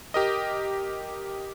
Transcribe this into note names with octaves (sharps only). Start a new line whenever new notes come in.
G4 A#4 D#5